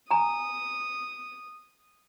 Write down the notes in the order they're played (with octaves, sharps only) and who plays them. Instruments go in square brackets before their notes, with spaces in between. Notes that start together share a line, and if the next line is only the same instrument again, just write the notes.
[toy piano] G#5 A#5 [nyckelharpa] D#6